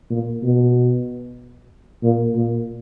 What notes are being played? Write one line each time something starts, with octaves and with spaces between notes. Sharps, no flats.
A#2
B2
A#2
A#2